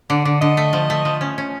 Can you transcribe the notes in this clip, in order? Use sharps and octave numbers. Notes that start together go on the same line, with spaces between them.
D3 D5
D3 D5
D3 D#5
A3
F3
A3
F3
C#4
C#4